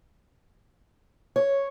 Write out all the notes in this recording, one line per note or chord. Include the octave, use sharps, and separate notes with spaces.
C#5